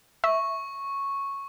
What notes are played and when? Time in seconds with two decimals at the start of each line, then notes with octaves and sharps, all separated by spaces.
0.24 E5 C#6